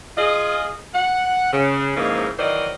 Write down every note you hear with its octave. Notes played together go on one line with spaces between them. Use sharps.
F4 G#4 D#5
F#5
C#3
G#2 C#3 E3 F3 A#3 D#4
D#3 E3 F#3 C5 D5 D#5